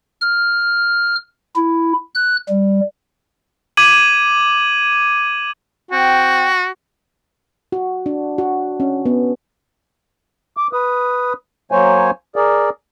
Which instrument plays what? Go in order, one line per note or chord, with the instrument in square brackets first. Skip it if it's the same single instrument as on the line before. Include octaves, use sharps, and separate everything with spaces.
[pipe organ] F6
E4
F#6
G3
[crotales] D6 G#6 D#7 F#7
[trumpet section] C4 G5 [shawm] F#4
[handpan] F#4
D4
F#4
C#4
B3
[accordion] D6
B4 D#6
F#3 A#3 C5 C#5 G#5
G#4 A#4 D5